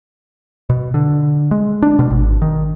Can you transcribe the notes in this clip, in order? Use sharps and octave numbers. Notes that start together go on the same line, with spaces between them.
B2
D3
G#3
D4
B2
G#1
D#3